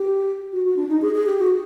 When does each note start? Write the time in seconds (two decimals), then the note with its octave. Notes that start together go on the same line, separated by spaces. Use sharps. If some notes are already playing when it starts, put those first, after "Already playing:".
Already playing: G4
0.53 F#4
0.65 F#4
0.77 D4
0.89 D#4
1.02 G#4
1.14 G#4
1.26 G4
1.39 F#4